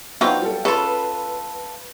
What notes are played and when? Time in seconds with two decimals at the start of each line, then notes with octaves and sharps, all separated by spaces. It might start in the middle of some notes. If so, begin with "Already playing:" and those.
0.21 F#3 B3 C4 D4 D#4 F4 F5 G5
0.42 G3 A4
0.65 C#3 F4 A4 B4 B5